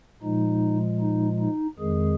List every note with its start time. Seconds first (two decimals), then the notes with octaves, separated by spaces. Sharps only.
0.22 A#2 F3 G#3 D#4
1.00 D#4
1.39 D#4
1.78 F2 D#3 G#3 G#4